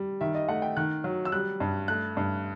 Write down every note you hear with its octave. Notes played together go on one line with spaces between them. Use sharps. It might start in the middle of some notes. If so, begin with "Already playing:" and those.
Already playing: G3
D#3 E5
D#5
A3 F#5
G5
D#3 F#6
F#3
E6
G3 F#6
G2
A3 F#6
G2